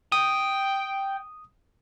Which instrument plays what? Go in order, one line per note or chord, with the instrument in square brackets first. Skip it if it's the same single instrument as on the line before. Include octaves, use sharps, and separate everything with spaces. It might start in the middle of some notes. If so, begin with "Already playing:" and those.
[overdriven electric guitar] G5 [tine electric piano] D#6